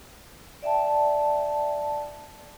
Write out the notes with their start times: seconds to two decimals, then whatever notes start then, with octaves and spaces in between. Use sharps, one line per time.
0.62 D5 E5 G5 A5